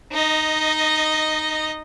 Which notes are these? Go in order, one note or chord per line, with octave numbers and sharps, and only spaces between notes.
D#4 D#5